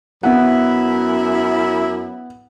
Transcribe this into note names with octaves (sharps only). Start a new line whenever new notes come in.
F#2 B3 E4 F#5